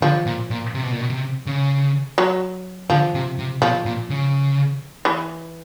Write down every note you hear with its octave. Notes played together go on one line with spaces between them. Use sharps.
D3 F3
A#2
A#2
C3
B2
A#2
B2
C3
C#3
F#3
D3 F3
C3
C3
B2 F3
A#2
C#3
E3